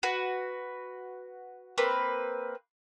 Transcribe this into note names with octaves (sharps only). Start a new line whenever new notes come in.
F#4 B4
A#3 C4 B4